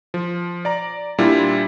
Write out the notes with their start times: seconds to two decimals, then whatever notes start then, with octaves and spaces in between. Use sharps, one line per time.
0.14 F3
0.65 D5 A#5
1.18 A#2 G3 D4 E4 F4